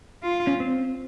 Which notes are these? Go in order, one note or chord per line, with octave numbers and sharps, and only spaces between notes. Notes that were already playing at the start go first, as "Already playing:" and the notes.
F4
C#4
C4